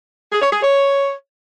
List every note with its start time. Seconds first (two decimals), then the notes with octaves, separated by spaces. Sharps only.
0.32 G#4
0.42 C#5
0.52 G#4
0.62 C#5